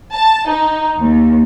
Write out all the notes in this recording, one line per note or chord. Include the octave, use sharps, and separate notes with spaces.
A5
D#4
D#2